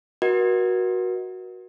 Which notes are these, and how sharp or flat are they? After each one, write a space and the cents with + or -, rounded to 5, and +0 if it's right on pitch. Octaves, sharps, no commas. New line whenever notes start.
F#4 +0 A#4 +45 D#5 +25